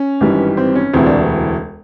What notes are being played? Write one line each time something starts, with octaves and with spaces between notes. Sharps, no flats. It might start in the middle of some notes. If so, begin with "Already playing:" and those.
Already playing: C#4
G#1 G2 E3 G3
C4
C#4
E1 D2 C3 E3 C4
D4